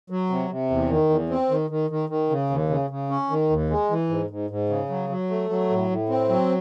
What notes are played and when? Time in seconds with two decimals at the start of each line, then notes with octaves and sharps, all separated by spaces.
0.10 F#3
0.30 C3
0.50 C3
0.70 E2
0.90 D#3
1.09 E2
1.29 C4
1.50 D#3
1.70 D#3
1.90 D#3
2.09 D#3
2.30 C#3
2.50 D#2
2.70 C#3
2.90 C#3
3.10 C#4
3.30 D#3
3.50 D#2
3.70 G#3
3.90 E3
4.09 G#2
4.30 G#2
4.50 G#2
4.69 C#3
4.89 F#3
5.09 F#3
5.30 A3
5.49 F#3
5.70 A2
5.90 A2
6.09 C4
6.29 F#3